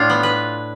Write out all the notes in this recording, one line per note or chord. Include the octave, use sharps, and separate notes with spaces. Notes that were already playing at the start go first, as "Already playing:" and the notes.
Already playing: A2 D4 F4
B3
B4